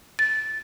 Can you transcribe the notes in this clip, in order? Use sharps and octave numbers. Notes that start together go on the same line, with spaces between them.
A6